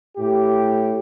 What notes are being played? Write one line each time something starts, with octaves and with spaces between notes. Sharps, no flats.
A2 G4